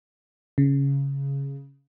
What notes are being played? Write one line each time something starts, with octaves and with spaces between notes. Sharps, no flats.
C#3